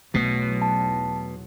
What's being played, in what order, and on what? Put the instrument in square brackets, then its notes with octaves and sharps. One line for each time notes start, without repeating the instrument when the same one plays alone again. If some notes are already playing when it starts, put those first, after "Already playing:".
[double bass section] B1 E2 F#3 [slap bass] B2 [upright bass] A3
[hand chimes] A5